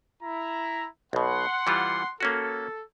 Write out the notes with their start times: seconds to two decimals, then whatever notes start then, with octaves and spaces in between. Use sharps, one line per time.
0.22 E4 A#5
1.13 B1 B2 F#5 C6
1.67 E3 G3 F4
2.20 A#3 C#4 F#4 A4